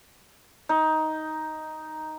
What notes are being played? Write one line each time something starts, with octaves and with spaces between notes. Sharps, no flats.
D#4